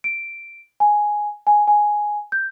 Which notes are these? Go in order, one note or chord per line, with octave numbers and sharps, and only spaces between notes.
D7
G#5
G#5
G#5
G6